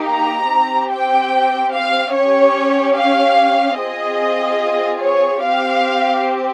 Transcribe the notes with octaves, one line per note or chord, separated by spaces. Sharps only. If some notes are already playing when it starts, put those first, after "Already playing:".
Already playing: A#3 D#4 G4
A#5
C4 G4
G5
F5
C#4 G4 C#5
F5
C4 F4 G#4 D#5
C#5
C4 G4 F5